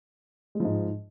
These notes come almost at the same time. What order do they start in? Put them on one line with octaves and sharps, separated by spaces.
G#3 F3 G#2